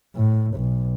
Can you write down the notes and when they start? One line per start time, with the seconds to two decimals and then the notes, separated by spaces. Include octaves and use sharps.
0.15 A2
0.55 B1